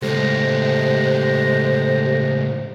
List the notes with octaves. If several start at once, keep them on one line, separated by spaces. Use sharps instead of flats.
C#2 A2 G#3 G4 A4 C5 A#6